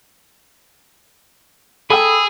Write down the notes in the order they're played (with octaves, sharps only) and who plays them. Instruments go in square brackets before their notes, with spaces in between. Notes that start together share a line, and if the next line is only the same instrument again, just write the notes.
[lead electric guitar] G#4 [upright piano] A4 G5 [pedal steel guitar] B5 D#6 E6